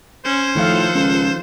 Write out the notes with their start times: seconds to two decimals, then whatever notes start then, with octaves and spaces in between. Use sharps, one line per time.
0.25 C#4 C5
0.55 A2 D#3 F3 A4 F5 F#5
0.95 C#2